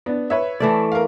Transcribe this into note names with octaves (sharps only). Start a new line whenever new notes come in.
B3 D4
B4 C#5 E5
E3 A3 D5
A#4 F5